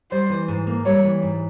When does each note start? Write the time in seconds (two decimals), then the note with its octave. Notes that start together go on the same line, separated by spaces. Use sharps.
0.12 G3 C5
0.30 E3
0.48 G#2
0.67 A#3
0.86 G3 C#5
1.04 E3
1.23 G#2